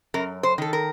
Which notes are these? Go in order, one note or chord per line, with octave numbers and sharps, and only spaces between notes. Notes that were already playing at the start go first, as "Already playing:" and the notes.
F#2 A#4
C5
D#3 A4
A#4